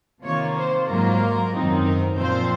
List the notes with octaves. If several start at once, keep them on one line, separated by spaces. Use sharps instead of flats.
C3 D#3 A#3 F4 C#5
C5
G#2 F#3 A#3 F4 A#4
F#2 D#3 F#3 C4 D#4
A#4
A#2 F3 C4 F4 C5